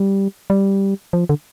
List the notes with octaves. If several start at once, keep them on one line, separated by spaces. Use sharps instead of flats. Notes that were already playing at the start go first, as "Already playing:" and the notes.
Already playing: G3
G3
F3
D3